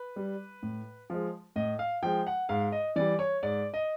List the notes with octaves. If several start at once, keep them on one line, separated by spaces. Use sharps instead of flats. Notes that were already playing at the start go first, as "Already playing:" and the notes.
Already playing: B4
G3
A2
F3 G#3
A2 D#5
F5
F3 G#3 G5
F#5
G#2 F5
D#5
E3 G3 D5
C#5
G#2 D5
D#5